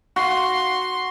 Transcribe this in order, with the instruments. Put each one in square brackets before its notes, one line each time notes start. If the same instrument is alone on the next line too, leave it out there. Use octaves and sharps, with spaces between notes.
[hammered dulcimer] F#4 [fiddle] C6